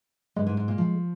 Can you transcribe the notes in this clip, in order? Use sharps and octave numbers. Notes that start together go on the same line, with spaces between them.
G2 G#3
G#2
G#2
A#2
F3